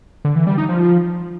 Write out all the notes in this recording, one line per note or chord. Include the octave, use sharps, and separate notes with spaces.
D3
E3
G3
D#4
F3